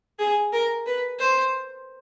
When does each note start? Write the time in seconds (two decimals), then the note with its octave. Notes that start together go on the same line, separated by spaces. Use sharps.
0.19 G#4
0.52 A#4
0.86 B4
1.19 C5